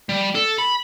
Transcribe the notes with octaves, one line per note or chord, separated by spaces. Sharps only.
G3
A4
B5